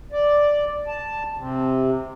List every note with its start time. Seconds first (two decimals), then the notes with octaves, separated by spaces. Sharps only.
0.12 D5
0.87 A5
1.37 C3